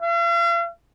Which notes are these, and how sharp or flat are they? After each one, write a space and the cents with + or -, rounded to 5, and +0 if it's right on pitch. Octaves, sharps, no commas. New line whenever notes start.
F5 -45